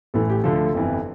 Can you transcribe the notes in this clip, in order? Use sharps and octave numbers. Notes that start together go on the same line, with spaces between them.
A1 A2 E3 A4
G4
D2 D3 F3 A4
G1 F2 E3